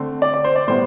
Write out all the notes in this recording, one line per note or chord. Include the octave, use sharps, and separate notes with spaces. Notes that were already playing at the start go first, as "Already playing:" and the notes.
Already playing: D3 A3 C4
D5
D5
C5
D5
A2 G3 B3 C5